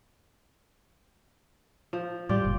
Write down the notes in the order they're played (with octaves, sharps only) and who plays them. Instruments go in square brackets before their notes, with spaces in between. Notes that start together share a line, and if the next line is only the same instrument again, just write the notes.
[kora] F3
[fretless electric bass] A2 G3 [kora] F4 G4 D5
[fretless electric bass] F#1 A#2